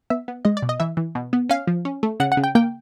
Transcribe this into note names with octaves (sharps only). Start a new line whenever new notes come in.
B3 E5
B3
G#3 D#5
D5
B2
D#5
E3 E5
E3
B2
B3
C#4 F5
F3
C#4
A3
C#3 F#5
F#5
C#3
G5
A#3 G5